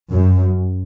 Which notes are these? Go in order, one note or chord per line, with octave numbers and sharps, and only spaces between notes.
F#2